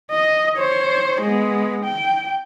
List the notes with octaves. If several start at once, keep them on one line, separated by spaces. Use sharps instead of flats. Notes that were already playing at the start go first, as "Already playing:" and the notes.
D#5
C5 C#5
G#3 B3
G5